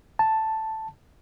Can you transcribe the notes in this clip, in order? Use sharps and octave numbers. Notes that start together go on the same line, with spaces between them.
A5